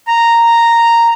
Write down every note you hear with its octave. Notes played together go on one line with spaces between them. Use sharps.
A#5